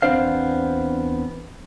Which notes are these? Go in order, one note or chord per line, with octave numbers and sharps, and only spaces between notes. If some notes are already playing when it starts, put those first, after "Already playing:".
E2 B3 C4 D4 C5 F5